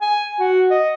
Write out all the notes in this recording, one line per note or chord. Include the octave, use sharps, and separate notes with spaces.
G#5
F#4
D#5